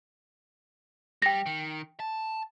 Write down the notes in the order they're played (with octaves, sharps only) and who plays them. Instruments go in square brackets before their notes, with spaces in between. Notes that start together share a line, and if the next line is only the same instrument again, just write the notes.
[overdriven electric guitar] G3 [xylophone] G5 A#6
[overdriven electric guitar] D#3
A5